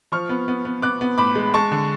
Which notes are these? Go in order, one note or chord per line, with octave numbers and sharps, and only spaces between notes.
F3 C#6 F6
B3
B3
B3
B3 D6 F#6
B3
A2 B5 D6
G#3
G#3 A5 C#6
D3